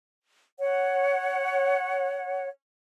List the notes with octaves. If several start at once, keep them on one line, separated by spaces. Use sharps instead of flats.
C#5 F#5